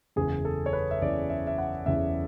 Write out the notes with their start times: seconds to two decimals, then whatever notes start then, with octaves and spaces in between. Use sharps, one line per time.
0.16 F#1 E2 C#3 E3 G#4
0.45 A4
0.66 C#5
0.73 B4
0.91 E5
1.01 F#1 E2 C#3 E3 D5
1.30 E5
1.47 E5
1.58 F#5
1.86 F#1 E2 C#3 E3 E5